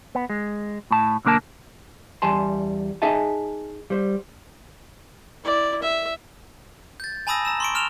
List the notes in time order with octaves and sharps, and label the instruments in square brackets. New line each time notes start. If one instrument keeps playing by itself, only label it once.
[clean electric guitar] B3
G#3
A2 A5
B1 D3 A#3 A#4 A5
[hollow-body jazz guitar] E2 G3 G#5 A5 C6
D#4 G#4 D#5 E5 G#5 A5
G3 C5
[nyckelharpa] E4 D5
E5
[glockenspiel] G6 A6
G#5 A5 B5 D#6 E6 A#6
A#5 E6 E7
C6 C#6 D7
F6 E7 F7 G7